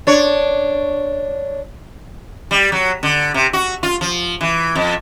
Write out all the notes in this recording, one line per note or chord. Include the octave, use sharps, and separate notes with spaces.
D4 C#5
G3
F#3
D3
C3
F#4
F4
F3
E3
F2